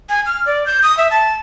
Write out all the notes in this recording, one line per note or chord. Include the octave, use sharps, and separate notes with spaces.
G#5
F6
D5
G6
D#6
E5
A5